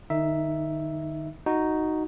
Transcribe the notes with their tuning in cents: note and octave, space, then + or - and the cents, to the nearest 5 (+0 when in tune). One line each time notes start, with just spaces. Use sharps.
D#3 -40 D#4 +10 E5 +0
D#4 +0 F#4 +0